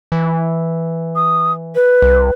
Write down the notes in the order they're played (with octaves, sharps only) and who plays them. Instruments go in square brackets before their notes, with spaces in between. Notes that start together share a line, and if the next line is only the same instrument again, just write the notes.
[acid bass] E3
[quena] D#6
B4
[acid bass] C2